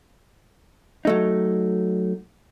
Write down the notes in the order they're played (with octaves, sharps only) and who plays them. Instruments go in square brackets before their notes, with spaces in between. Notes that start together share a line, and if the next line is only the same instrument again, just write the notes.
[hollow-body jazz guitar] F#3 A3 D#4